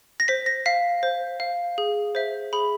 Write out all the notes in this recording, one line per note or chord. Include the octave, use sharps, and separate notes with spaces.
A#6
C5 B6
A#6
F5 B6
C5
F5
G#4
C5 E5
G#4 B5